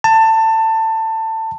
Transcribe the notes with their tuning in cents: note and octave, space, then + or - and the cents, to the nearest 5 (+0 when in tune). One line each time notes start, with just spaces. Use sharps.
A5 +20